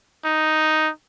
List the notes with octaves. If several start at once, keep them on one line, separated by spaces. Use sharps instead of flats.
D#4